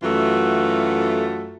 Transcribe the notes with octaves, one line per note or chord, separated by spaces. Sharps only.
F#2 E3 A3 F4 F#4